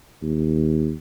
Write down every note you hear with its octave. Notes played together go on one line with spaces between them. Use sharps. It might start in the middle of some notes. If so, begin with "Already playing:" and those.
D#2